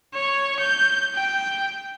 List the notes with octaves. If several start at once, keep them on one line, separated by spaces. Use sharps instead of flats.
C#5
G6
G5